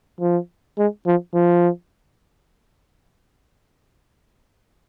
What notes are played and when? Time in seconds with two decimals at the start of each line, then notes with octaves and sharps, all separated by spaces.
0.20 F3
0.78 G#3
1.06 F3
1.34 F3